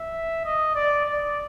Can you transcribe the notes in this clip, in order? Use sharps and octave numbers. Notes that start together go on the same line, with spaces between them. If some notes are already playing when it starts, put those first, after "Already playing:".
Already playing: E5
D#5
D5
D5